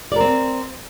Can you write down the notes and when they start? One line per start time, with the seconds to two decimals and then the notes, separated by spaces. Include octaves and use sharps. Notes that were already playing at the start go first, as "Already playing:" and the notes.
0.12 D5
0.16 A#4
0.20 C4